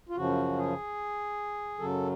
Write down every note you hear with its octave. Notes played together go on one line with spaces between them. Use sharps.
F4
F#2 C#3 F3 F#4
G#4
F#2 C#3 F#3 A4